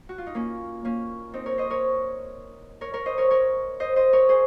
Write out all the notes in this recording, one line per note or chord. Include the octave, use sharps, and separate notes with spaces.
F#4
F4
D#4
A#3 C#4
A#3 C#4
C4 D#4
A#4 C#5
C5 D#5
A#4 C#5
A#4 C#5
A#4 C#5
C5 D#5
A#4 C#5
A#4 C#5
C5 D#5
C5 D#5
A#4 C#5
G#4 C5